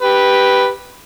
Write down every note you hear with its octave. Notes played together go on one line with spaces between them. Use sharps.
G4 B4